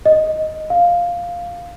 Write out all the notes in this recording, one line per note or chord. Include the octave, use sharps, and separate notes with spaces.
D#5
F5